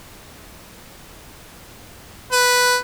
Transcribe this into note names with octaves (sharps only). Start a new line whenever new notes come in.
B4